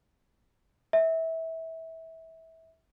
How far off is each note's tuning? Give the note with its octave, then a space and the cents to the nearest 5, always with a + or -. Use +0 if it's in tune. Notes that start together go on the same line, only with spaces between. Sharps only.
E5 -25